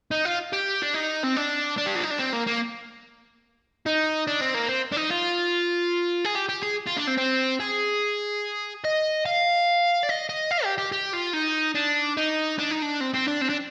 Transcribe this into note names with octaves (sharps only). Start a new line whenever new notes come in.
D#4
F4
G4
D4
D#4
C4
D4
D4
G4
F4
D#4
D4
C4
A#3
A#3
D#4
D4
C4
A#3
C4
D4
D#4
F4
G#4
G4
G4
G#4
F4
D4
C4
C4
G#4
D#5
F5
D5
D#5
D#5
F5
G4
G4
G4
F4
D#4
D4
D#4
D4
D#4
D4
C4
C4
D4
C4
D4